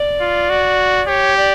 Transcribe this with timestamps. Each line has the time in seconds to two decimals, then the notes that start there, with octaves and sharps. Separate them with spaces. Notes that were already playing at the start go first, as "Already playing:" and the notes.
Already playing: D5
0.20 F4
0.50 F#4
1.07 G4 C#5
1.37 D5